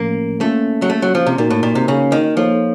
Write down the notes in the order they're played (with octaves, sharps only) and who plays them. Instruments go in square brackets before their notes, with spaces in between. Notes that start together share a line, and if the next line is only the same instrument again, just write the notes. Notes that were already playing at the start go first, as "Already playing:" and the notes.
Already playing: [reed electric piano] A2 F3 A3 C#4 [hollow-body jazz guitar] A#3
[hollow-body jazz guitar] A3 [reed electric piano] A#3 C#4 F4
[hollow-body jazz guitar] F#3
A3
F#3
F3
C3
[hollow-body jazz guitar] A#2 [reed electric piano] A#3 D#4 F#4 A#4
[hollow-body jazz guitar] A2
A#2
C3
C#3
D#3
[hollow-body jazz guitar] F3 [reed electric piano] A#3 D#4 A4 C#5